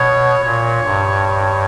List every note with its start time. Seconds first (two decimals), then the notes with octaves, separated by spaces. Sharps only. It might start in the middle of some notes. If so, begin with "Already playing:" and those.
Already playing: B2 C#5
0.44 A#2 C#5
0.83 G2